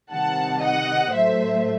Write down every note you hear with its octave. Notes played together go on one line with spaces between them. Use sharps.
C3 D#3 G3 F#5 A5
D#5 F#5
A2 F#3 A3 C5 E5